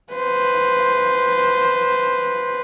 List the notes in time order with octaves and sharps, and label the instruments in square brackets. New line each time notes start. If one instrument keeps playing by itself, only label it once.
[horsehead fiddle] B4 C5